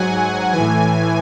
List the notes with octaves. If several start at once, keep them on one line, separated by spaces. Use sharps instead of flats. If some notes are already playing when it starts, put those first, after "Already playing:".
Already playing: G#2 F#3 F#5 G#5
A2 E3 G#5